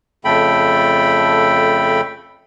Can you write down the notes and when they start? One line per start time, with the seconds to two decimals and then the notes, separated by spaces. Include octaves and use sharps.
0.25 F2 C#3 A3 A4 G5 B5